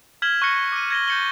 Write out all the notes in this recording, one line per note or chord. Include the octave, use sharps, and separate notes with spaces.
F6 G#6 B6 E7 F#7 G7
C#6 F#6 G#6 A#6 C#7 D#7
D6 D#7
G#6 A#6 C#7 G7
G6 A6 C#7 F#7 G7